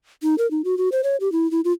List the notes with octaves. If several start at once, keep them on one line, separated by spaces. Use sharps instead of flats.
D#4
A#4
D#4
F#4
F#4
C5
C#5
G4
E4
E4
F4